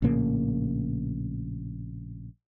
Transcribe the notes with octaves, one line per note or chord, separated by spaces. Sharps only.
A#1 A2 C#3 A#3